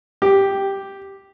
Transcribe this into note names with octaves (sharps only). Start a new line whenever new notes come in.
G4